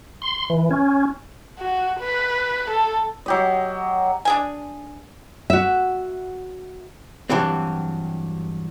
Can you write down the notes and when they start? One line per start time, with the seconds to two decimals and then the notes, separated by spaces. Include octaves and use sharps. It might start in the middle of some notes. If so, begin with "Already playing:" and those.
0.22 C6
0.50 E3
0.71 C#4
1.59 F#4
2.00 B4
2.70 A4
3.26 F#3 G4 D#5
4.25 D4 G#4 G#5
5.50 F#4 E5
7.30 G2 E3 F#3 C4